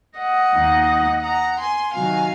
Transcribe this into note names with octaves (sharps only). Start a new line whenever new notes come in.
D#5 F#5
D#2 D#3 A#3 D#4
F#5 A#5
G#5 C6
C3 D#3 F#3 F5 G#5